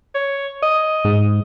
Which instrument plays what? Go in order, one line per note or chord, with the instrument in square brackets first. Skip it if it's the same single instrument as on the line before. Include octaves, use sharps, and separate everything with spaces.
[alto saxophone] C#5
D#5
[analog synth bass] G#2